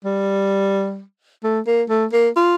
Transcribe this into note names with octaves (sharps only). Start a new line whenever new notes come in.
G3
A3
A#3
A3
A#3
F4